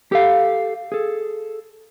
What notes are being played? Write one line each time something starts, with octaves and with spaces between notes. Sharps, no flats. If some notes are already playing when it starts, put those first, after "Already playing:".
G4 A4 F5
G#4 A4